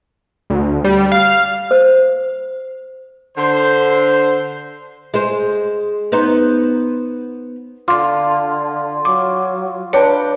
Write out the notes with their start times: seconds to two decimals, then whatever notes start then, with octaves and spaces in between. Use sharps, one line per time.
0.50 D2
0.84 G3
1.12 F5
1.71 C5
3.37 D3 C5
5.14 G#3 C5
6.12 B3 D#4 C5
7.88 D3 F4 C6 D6
9.05 F#3 D6
9.93 D4 B4 C#5 G5 A#5